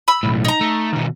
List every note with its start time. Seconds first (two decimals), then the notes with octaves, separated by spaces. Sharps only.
0.08 B5 E6
0.23 B1 A2
0.45 D#4 A#5
0.61 A3
0.93 D#2 B2